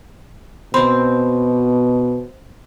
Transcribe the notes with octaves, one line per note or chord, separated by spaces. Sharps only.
B2 C4 B5 C6